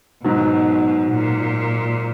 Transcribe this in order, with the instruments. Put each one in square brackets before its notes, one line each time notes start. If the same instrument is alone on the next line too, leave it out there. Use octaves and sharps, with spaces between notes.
[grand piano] G#2 D#3 F#3 [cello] B2
[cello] A#2